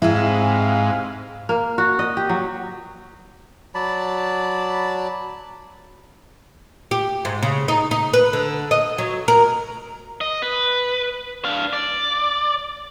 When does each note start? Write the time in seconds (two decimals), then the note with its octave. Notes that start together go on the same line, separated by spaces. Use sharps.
0.02 G#2 C3 C4 E4 G#4 F5
1.49 A#3
1.78 F#4
1.99 D#5
2.17 G4
2.29 F#3
3.75 F#3 D5 A5 B5
6.91 G4
7.25 G#2
7.43 C#3
7.68 D#4
7.91 D#4
8.13 B4
8.33 D3
8.71 D#5
8.98 F#3
9.28 A#4
10.21 D#5
10.42 B4
11.45 D4 F5
11.73 D5